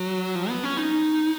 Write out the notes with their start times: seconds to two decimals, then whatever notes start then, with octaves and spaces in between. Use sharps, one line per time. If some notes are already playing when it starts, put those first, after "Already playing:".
Already playing: F#3
0.35 F3
0.49 B3
0.63 C#4
0.77 D#4